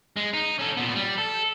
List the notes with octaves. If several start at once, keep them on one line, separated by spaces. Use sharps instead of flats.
G#3
D#4
C#4 A4
A#2 B3
G3
A4